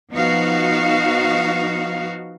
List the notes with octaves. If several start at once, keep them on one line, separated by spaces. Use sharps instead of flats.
F3 B3 D#4 F#4 F5